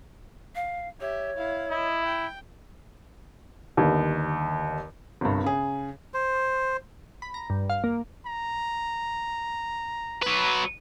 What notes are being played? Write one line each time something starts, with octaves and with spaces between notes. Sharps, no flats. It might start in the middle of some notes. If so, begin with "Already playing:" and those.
F5
G4 C#5 E5
E4 F5
E4 D#5
G5
G1 D#2
G1 C2 G2
C#3 G#4
C5
B5
A#5
G2
F5
A#3
A#5
F#3 B4